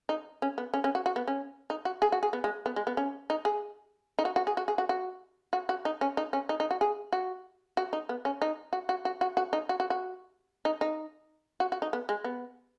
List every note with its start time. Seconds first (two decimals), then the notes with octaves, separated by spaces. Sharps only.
0.09 D#4
0.42 C#4
0.58 B3
0.74 C#4
0.84 C#4
0.95 F#4
1.06 F#4
1.16 B3
1.27 C#4
1.70 D#4
1.85 F#4
2.02 G#4
2.12 F#4
2.23 G#4
2.33 B3
2.44 G#3
2.66 B3
2.76 G#3
2.87 B3
2.97 C#4
3.30 D#4
3.45 G#4
4.19 D#4
4.25 F#4
4.36 F#4
4.47 G#4
4.57 F#4
4.68 G#4
4.78 F#4
4.89 F#4
5.53 F#4
5.69 F#4
5.85 D#4
6.01 C#4
6.17 D#4
6.33 C#4
6.49 D#4
6.60 D#4
6.71 F#4
6.81 G#4
7.12 F#4
7.77 F#4
7.93 D#4
8.09 B3
8.25 C#4
8.42 D#4
8.73 F#4
8.89 F#4
9.05 F#4
9.21 F#4
9.37 F#4
9.53 D#4
9.69 F#4
9.80 F#4
9.90 F#4
10.65 D#4
10.81 D#4
11.60 F#4
11.72 F#4
11.82 D#4
11.93 B3
12.09 G#3
12.24 B3